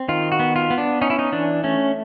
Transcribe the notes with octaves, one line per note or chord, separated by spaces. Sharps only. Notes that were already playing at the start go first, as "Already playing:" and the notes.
Already playing: C4
D#3 F4
F#4
B3
F4
B3
D4
C#4 D#4
E4
D#4
E3 D4
A3 C#4